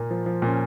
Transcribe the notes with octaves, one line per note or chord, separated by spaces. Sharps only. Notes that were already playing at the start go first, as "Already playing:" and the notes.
Already playing: A#2 A#3
F3
F3
A#2 C#4